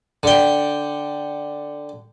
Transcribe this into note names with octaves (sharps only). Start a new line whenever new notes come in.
D3 G5